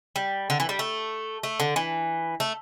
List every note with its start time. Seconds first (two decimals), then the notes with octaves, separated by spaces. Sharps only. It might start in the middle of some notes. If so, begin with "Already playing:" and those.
0.16 G3
0.50 D3
0.60 E3
0.69 G3
0.79 A3
1.43 A3
1.60 D3
1.76 E3
2.40 A3